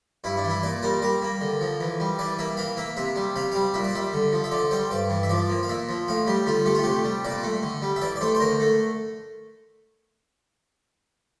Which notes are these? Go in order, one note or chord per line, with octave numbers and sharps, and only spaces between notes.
G2 E4
D4
E3
E4
A#2 D5
G3 A#4
G3 A#4
A#3
D3
F3
E3
G3
E3 D5
A#3 E5
E3 F5
A#3 E5
C3 E5
G3
C3 F5
G3 F5
A#2 E5
D5
G3 E5
D3
F3
E5
D3 D5
G3 C5
G2 D5
E3
E5
F3 D5
A#3
F5
A#2 E5
F3
A2 F5
G3 G4
D3 F4
A3 G4
F4
C3 G4
G3
A#2 D5
A3
D3
G3
E5
E3 D5
D5
A3 C5
C5
D3 A#4
A3